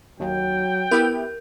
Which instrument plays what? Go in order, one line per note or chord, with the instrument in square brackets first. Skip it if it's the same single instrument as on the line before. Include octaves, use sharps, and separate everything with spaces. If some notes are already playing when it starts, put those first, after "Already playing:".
[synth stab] D#2 [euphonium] F#3 [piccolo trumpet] G5
[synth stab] B3 E4 G4 [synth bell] A#4 G6